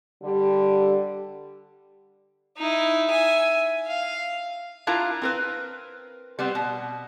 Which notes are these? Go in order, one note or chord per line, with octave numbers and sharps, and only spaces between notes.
D3 G3
D#4 E4
E5 G#5
F5
D4 E4 F4 A#4 A#5
C4 A#4 B4
G3 B3 C4
B2